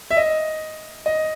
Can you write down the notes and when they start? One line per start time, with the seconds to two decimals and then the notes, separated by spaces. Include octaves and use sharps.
0.11 E5
0.17 D#5
1.06 D#5